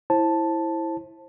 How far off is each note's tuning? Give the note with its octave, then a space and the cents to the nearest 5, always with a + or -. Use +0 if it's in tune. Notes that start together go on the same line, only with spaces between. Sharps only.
E4 +0 C5 +30 A5 +0